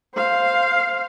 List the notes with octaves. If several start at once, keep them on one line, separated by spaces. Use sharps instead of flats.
C5 F5